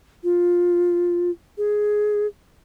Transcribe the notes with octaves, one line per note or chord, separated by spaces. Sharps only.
F4
G#4